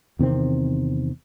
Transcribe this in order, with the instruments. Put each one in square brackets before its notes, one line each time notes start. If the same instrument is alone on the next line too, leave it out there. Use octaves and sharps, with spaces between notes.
[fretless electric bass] E2 C3 D#3 C4